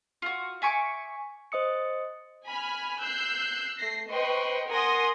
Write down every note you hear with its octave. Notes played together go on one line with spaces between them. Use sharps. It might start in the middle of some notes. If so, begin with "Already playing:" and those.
F4 F#4
E5 G#5 C#6 D6
C5 D#5 D#6 C#7
G#5 B5 F6
E6 F#6 G6 C7
A3 A#6 C7
B4 C5 D#5 G5 C6 C#6
A#4 F#5 G#5 C6 D#6 A#6